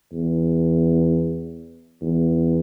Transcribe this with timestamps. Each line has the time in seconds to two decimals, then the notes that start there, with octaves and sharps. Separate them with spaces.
0.13 E2
2.01 E2